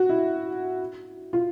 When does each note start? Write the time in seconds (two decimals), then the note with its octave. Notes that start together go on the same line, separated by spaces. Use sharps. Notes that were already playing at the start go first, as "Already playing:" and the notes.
Already playing: F#4
0.09 E4
1.33 F4